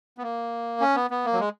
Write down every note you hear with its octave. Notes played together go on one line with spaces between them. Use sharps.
B3
A#3
C#4
B3
B3
A#3
F#3
G#3